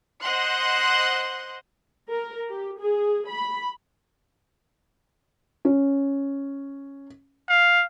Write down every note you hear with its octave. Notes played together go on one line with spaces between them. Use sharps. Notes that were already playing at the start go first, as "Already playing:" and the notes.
C5 D#5 F#5 C6 F#6
A#4
G4
G#4
B5
C#4
F5